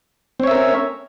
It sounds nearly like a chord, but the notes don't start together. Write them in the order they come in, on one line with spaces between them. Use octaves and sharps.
C4 C#5 E5 A#4 C#4